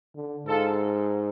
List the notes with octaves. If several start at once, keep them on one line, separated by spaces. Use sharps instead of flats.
D3
G#2 F4 A4